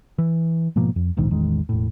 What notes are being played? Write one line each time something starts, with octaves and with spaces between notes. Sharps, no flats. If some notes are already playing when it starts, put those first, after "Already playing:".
E3
G#2 B2 F3 A#3
F2
D1 A#1 G#2 D#3
A1 E2 D#3 G#3
E1 A2